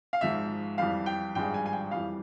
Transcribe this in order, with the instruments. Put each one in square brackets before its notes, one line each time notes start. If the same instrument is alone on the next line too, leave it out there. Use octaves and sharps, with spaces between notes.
[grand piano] F5
G#1 G#2 F3 E5
F2 E3 G3 F5
G5
G#1 G2 F3 G#3 G5
G#5
G#5
G5
F2 E3 G3 F5